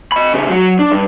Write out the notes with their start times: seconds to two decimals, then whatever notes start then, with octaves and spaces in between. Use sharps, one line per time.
0.12 D#5 B5
0.33 C#3 G4
0.50 F#3 F#4
0.79 D4
0.92 G2